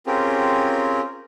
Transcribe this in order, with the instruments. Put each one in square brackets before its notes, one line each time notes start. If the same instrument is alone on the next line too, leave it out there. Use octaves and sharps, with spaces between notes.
[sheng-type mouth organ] C4 C#4 F4 G4 G#4 A#4